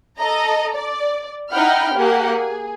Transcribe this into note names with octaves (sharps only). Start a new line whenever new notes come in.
A4 D#5 A#5
D5
D#4 E4 F#5 G5 B5 F6
A#3 G4 G#4 F#5
G#4